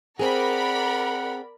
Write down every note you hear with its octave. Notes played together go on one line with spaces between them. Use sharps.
C4 G#4 A#4 D5 F#5 B5